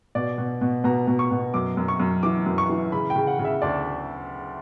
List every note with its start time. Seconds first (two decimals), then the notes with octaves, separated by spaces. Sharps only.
0.15 B2 D5
0.38 B2
0.61 B2
0.84 B2 A#5
1.08 B2
1.19 C#6
1.31 B2
1.54 F#2 D6
1.77 F#2
1.88 C#6
2.00 F#2
2.23 E3 D6
2.46 F#2
2.58 C#6
2.69 E3
2.92 C#3 B5
3.10 G5
3.16 C#3
3.27 F#5
3.39 C#3
3.45 E5
3.62 D2 D5